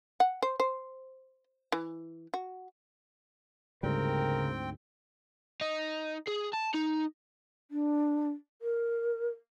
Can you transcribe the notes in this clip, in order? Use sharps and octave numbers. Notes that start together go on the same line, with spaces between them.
F#5
C5
C5
E3
F#4
D2 G#2 C#3 G3 C4 A#4 G5
D#4
G#4
A5
D#4
D4
A#4